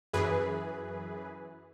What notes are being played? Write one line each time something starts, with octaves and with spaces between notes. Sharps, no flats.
F#2 E3 G#4 B4